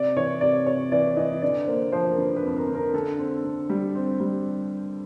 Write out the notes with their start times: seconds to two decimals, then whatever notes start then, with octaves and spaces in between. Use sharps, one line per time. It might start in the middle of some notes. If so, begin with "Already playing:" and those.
Already playing: C3 D5
0.17 E3 C#5
0.41 C3 D5
0.66 C3 C#5
0.92 E3 D5
1.17 E3 D#5
1.42 D3 D5
1.67 A#3 C5
1.92 F3 C5
2.11 A#4
2.18 D3 B4
2.36 B4
2.43 F2
2.56 A#4
2.69 D3
2.75 A#4
2.94 D3 A4
3.18 C4
3.44 D3
3.70 G3
3.95 C4
4.20 G3